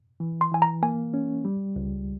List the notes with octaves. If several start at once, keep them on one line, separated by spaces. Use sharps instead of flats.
E3
C6
E3 G#5
A#5
A#3 G#5
C#4
G3
C#2